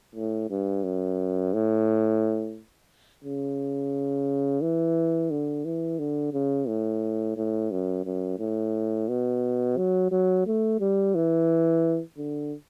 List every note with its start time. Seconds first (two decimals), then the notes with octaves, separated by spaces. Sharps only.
0.15 A2
0.50 G2
0.84 F#2
1.53 A2
3.24 C#3
4.62 E3
5.31 D3
5.65 E3
5.99 D3
6.33 C#3
6.68 A2
7.37 A2
7.71 F#2
8.06 F#2
8.39 A2
9.08 B2
9.77 F#3
10.11 F#3
10.46 A3
10.80 G3
11.15 E3
12.18 D3